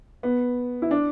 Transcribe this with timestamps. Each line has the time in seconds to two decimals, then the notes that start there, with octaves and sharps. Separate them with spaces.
0.23 B3
0.82 E4
0.91 D4